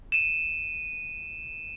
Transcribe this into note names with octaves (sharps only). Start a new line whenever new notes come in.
D#7 E7